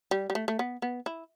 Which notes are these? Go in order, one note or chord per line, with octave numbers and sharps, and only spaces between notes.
G3
G3
A3
A3
B3
B3
E4